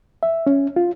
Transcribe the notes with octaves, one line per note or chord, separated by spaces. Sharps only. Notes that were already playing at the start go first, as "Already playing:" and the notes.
E5
C#4
F4